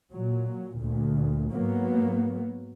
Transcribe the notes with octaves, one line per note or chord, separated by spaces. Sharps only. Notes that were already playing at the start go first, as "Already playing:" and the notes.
A#2 F#3
D2 A#2
G#2 F#3 A#3 B3